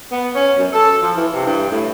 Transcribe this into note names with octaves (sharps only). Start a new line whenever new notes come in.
B3
C#4
F#2
A4
F3
E3
C3
G2
A2